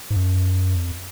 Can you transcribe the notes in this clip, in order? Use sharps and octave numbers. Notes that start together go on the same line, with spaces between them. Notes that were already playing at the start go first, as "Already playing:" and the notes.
G#2
F#2
F2